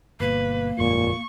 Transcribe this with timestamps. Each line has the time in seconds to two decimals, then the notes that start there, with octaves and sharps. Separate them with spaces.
0.20 G1 B2 A#3 B4
0.79 G1 F2 A#2 G#3 C#6